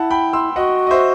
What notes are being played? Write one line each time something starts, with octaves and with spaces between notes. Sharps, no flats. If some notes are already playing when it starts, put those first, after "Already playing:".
Already playing: E4 F#5 A5
G5 B5
C6 E6
F#4 D#5 F#5
D#5
C5 E5